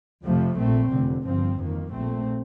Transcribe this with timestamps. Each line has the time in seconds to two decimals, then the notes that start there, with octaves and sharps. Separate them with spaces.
0.24 F2 C3 F3 A3
0.58 A#1 A#2 A3 C4
0.91 F1 F2 D3
1.25 G1 G2 F3 C4
1.59 F2 D#3 A#3
1.92 A#1 A#2 A3 C4